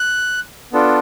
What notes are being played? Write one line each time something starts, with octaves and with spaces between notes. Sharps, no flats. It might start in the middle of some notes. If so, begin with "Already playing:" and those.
Already playing: F#6
B3 D4 F4 A4